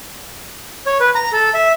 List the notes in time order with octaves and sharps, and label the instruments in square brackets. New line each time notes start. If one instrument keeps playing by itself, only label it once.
[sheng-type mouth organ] C#5
B4
A#5
A4
E5